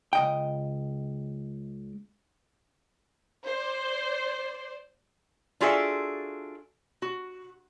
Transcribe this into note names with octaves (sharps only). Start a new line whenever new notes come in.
C#2 D#5 G5
C5 D5
D4 F4 F#4 G#4 A4 E5
F#4